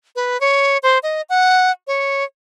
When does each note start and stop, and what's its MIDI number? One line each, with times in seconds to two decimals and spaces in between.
0.16 0.40 71
0.40 0.78 73
0.83 0.98 72
1.03 1.21 75
1.29 1.71 78
1.87 2.24 73